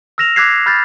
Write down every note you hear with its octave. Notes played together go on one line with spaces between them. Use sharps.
E6 F6 A#6 E7 F7
D6 E6 F#6 G#6 B6 C7
B5 F6 G6 A6